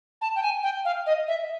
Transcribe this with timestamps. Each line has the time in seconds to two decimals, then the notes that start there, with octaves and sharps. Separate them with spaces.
0.21 A5
0.36 G5
0.43 G#5
0.63 G5
0.85 F5
1.06 D#5
1.28 E5